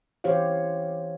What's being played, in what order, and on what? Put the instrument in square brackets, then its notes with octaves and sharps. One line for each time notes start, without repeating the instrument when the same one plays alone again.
[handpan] E3 G4 C5 C#5 F5